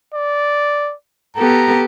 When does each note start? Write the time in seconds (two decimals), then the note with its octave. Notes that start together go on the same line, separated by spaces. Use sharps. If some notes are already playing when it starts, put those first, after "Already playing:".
0.15 D5
1.36 B3 G4 A4 A#5